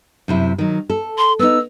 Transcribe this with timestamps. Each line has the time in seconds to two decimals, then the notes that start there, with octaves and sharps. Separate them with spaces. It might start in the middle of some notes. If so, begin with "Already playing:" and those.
0.28 F#2 C3 E4
0.58 D#3 F#3
0.90 A4
1.18 C6
1.39 B3 D#4 E6